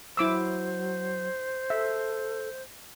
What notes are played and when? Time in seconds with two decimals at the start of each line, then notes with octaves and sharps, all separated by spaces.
0.17 F#3 E4 C5 D6 E6
1.70 A4 E5